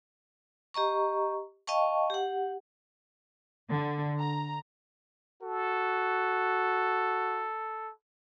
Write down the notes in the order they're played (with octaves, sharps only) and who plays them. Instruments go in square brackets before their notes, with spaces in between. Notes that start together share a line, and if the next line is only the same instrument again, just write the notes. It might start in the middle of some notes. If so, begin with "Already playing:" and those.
[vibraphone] G4 D#5 A#5 C#6
D#5 F5 G5 A5 C#6
G4 F#5
[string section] D3
A#5
[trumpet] F#4 [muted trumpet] A4